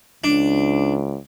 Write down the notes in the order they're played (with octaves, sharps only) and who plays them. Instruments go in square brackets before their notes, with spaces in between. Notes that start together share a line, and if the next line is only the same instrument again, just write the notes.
[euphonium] C#2 [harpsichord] D4